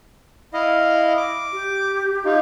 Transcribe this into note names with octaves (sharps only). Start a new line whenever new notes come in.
E4 D#5 F5
D6
G4
D#4 F4